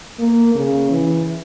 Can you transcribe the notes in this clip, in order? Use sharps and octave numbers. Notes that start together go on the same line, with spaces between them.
A#3
C#3
E3